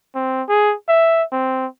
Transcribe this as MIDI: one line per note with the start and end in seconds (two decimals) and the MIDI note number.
0.15 0.43 60
0.49 0.75 68
0.88 1.23 76
1.32 1.66 60